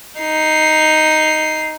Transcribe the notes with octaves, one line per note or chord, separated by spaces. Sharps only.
D#4 C7